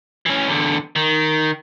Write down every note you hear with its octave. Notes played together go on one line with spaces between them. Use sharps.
E3 C#4
E2 D3
D#3